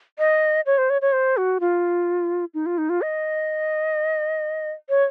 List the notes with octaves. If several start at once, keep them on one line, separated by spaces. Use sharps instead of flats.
D#5
C#5
C5
C#5
C#5
C5
F#4
F4
D#4
F4
D#4
F4
D#5
C#5